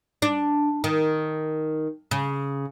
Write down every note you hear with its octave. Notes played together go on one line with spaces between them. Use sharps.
D4
D#3
C#3